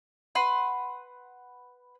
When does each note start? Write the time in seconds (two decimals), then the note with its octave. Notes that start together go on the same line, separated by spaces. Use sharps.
0.35 B4 F#5 C6